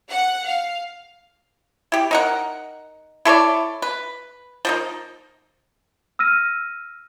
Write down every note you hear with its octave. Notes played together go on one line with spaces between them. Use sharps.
F#5
F5
E4 G4
D#4 A#4 F#5
E4 A4 C#5 D5
B4
F3 A#3 D#4
E6 F6 A#6 D#7